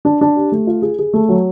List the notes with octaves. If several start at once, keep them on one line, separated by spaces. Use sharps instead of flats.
D4
D4
G4
A3
F4
G#4
G#4
A3
F#3